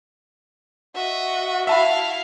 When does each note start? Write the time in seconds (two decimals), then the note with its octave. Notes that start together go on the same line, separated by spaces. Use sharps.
0.95 F#4 D#5 E5
1.67 E4 E5 F5 A5 B5